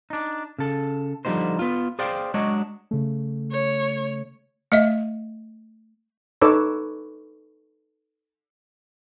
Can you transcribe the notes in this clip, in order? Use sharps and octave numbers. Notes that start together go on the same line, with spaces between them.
D4 D#4
C#3 A4
D3 F3 G3 B3 D#4 C5
B3 F4
G#4 C5 D5 F5 G5
F#3 G#3 D4 C#5 D#5
C#3 A3
C#5
A3 D#5 E5
D#4 A4 B4 C#5 D6 E6